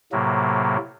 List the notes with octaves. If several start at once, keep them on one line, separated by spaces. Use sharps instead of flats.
A2 C3 F#3 A#3